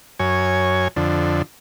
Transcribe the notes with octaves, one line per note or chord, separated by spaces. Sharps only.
F#2 C#5 G#5
F2 D3